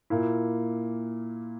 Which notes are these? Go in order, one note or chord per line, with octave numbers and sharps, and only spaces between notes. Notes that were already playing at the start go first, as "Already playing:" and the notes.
A#2 A#3 E4